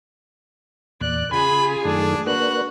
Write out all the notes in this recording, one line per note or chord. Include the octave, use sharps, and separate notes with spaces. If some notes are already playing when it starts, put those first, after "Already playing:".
E2 A#2 D5 F#6
C#3 F4 G#4 G#5 B5
F#2 D#3 A3 D4
A#3 D4 F#4 B4 F#6